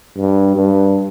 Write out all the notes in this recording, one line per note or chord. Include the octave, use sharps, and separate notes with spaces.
G2
G2